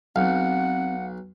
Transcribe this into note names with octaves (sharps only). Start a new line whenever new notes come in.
B1 C4 F5 F#5